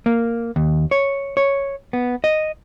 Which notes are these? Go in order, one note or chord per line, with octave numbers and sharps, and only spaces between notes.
A#3
D#2
C#5
C#5
B3
D#5